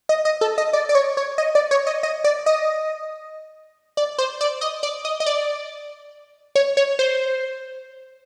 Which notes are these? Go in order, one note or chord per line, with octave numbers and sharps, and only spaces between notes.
D#5
D#5
A4
D#5
D5
D5
C#5
C#5
D#5
D5
C#5
D#5
D#5
D5
D#5
D5
C5
D5
D#5
D5
D#5
D#5
D5
C#5
C#5
C5